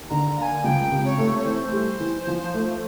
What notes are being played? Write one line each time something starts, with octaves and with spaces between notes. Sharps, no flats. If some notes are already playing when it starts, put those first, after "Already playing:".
Already playing: D#2
D3 A#5
A#3 G#5 A#5
C#2 G5
C3
C#5
A3
C#5
E3 C5
G3
E3
F3
A3